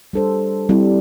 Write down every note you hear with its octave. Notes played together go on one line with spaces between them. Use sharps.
G3 D4 A4 C5
G3 C4 E4 G4